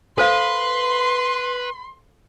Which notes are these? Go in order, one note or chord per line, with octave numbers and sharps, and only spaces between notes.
A4 B4 C5 F5 C6